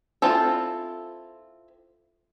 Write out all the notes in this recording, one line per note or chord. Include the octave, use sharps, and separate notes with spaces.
C4 E4 F4 A4